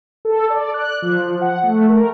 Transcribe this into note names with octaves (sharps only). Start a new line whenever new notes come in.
A4
D5
F#6
F3
F#5
A3
A#4